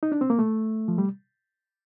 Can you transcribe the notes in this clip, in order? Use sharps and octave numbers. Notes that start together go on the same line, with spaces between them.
D#4
D4
C4
A#3
A3
F3
G3